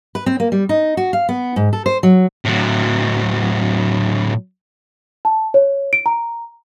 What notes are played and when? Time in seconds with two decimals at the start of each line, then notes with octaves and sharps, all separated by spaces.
0.15 B4
0.26 C4
0.40 A#3
0.52 G3
0.69 D#4
0.97 F#4
1.13 F5
1.29 B3
1.56 G#2
1.73 A4
1.86 C5
2.03 F#3
2.45 A2 F#3
5.25 A5
5.54 C#5
5.93 D7
6.06 A#5